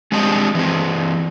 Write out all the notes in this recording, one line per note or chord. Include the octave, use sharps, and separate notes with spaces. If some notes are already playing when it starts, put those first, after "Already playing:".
G#3 C4 D4 G4 D#5
E3 C4